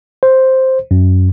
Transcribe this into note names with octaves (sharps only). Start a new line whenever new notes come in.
C5
F#2